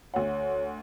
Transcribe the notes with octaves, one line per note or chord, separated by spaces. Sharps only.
D2 F#4 C#5 F#5